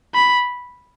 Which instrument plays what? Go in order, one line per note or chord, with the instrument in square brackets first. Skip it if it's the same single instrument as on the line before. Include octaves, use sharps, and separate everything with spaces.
[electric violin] B5